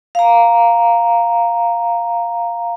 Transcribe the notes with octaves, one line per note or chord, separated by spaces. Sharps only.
F5 A#5